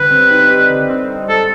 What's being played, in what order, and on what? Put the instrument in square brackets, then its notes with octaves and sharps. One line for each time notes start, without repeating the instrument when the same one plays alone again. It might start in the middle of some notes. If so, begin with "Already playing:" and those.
Already playing: [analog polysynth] D3 G3 [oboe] B4
[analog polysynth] C4
D#4
G3
D3
C4
D#4
[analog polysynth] G#2 [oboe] A4